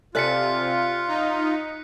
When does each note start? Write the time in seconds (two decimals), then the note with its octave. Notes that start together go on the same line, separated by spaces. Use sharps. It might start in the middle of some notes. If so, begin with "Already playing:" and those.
0.15 C3 F4 A4 D5 G#5 F#6 B6 C#7
1.08 D#4